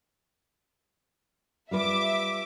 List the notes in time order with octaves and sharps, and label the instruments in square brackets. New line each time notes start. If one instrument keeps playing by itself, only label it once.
[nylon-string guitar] G3 F4 B4 [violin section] E5 D6